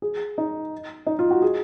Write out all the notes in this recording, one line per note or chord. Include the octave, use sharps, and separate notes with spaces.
G#4
D#4
D#4
F4
F#4
G#4